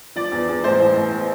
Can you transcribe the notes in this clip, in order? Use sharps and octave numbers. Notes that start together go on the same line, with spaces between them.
F3 D5
E2
E2
A1 C5
A1
A1